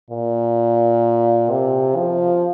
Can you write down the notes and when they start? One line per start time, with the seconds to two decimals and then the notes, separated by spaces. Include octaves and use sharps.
0.10 A#2
1.51 C3
1.97 F3